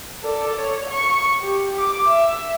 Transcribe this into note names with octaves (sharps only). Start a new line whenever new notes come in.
A4 D5
C#5
C#6
G4
D6
E5